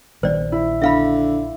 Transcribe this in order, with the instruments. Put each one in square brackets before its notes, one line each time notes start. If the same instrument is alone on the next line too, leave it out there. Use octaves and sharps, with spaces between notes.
[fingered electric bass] A#1 D#3 G3 [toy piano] C5 D5
[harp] E4
[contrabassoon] D3 [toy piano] E5 F5 B5